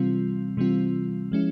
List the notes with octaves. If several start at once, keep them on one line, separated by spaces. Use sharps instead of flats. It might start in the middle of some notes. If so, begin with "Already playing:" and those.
Already playing: C3 E3 G3 C4 F4
C3 E3 G3 C4 F4
F3 G#3 C#4 E4